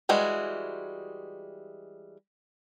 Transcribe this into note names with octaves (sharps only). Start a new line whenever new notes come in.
E3 G3 G#3 F#4